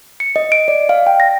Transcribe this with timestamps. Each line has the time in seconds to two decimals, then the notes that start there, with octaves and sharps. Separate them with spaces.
0.20 C#7
0.36 D#5
0.52 D7
0.68 D5
0.89 F5
1.07 G5
1.20 A#6